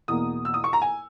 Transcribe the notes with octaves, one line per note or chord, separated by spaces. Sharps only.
E2 B2 A#3 D#6
E6
D#6
C#6
A#5
G#5